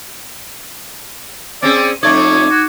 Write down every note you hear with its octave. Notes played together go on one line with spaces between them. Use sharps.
C4 C#4 G#4 D5
F2 A3 D#4 C#5 D5 C#6 D6 G#6
F#4